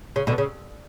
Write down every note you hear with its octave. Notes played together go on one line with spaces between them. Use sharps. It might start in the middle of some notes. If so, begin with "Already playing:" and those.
C#3
B2 D3
C#3